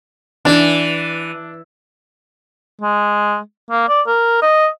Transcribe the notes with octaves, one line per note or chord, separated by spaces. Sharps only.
E3 D4
G#3
A#3
D5
A#4
D#5